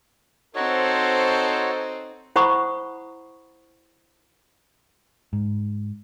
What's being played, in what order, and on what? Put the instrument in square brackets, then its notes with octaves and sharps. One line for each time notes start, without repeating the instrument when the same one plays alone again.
[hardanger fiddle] C4 D#4 [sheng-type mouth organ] F#4 C#5 [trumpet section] A4 C5
[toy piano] E4 C5 F#5 B5 C#6 D#6
[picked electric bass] G#2